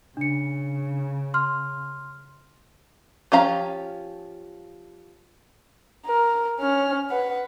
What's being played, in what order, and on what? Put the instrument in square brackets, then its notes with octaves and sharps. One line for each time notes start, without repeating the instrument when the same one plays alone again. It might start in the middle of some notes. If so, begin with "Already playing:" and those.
[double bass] C#3 [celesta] D4 C#7
[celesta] C6 F6
[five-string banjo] F3 C#4 G4 F5 A#5
[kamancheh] A#4
C#4 F6
B4 F#5